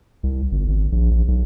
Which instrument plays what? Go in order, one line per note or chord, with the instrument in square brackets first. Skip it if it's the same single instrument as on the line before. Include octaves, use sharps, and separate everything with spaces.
[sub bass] C2
G1
G#1
A#1
A#1
B1